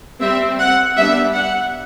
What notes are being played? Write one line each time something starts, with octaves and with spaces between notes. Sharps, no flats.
G3 C4 E5
F#5
G3 B3 D4 E5
F#5